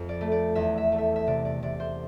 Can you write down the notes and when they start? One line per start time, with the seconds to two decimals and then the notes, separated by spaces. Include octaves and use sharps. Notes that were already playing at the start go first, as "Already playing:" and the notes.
Already playing: F2
0.09 D5
0.21 A3
0.32 D5
0.55 E2 E5
0.78 E5
0.92 A3
0.98 E5
1.16 E5
1.27 C3 D5
1.45 D5
1.62 C3 D5
1.80 C5